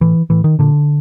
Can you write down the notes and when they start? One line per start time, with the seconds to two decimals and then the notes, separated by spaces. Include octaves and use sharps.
0.01 A2 E3
0.30 A2 E3
0.44 D#3
0.59 A#2 D3